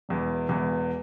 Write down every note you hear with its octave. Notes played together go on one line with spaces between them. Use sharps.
E1 E2 E3
E1 E2 E3